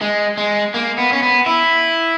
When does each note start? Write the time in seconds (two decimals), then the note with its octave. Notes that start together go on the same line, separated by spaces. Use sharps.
0.01 G#3
0.38 G#3
0.74 A#3
0.98 B3
1.12 C#4
1.22 B3
1.46 E4